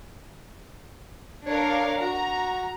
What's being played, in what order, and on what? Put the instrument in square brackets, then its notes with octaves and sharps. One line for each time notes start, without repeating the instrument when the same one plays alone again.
[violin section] D4 A#4 F5 [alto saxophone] C#5
[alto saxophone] F#4 [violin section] A#5